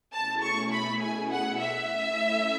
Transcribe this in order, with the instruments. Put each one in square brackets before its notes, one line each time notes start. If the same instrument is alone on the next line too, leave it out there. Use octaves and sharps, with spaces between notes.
[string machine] B2 A3 C#4 E4 G#4 [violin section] A5
[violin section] C#6
B5
G#5
F#5
E5
[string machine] A3 C#4 E4 A4